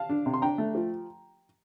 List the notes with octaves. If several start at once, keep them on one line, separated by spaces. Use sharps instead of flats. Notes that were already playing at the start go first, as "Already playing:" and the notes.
Already playing: F5 A5
D4
C3
C6
D4 G5 A#5
A3
F3